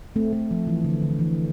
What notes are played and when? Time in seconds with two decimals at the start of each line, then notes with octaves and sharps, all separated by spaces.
0.16 A3 C4
0.33 A3
0.51 F3
0.67 E3
0.84 D3
1.02 D3
1.19 E3